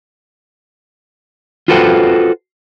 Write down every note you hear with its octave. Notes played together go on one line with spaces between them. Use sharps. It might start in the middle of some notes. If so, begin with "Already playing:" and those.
F4 F#4 A4 B4 C5 G5